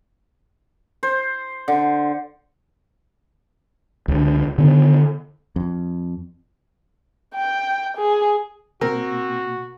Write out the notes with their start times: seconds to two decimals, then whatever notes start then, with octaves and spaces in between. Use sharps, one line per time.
1.03 C5
1.68 D3
4.08 C#2 D3
4.58 D3 D#3 B3
5.56 F2
7.35 G5
7.98 G#4
8.81 B2 A#3 C4 F#4 A#4